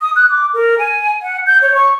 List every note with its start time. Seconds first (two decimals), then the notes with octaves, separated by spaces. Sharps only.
0.01 D#6
0.16 F#6
0.30 D6
0.54 A#4
0.79 G#5
1.22 F#5
1.46 G6
1.62 C#5
1.75 C#6